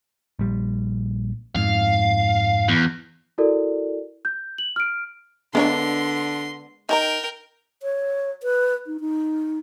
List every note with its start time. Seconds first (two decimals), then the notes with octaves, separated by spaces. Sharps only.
0.39 A#1 G3
1.55 F2 G#2 F5
2.68 E2
3.38 E4 F#4 A4 A#4 D5
4.25 G6
4.58 F#7
4.76 F6 D7
5.55 D3 G#3 A#3 B3 D4 C#5 C6
6.89 D#4 A#4 G5 G#5 A#5
7.83 C#5
8.43 B4
8.86 D#4
9.00 D#4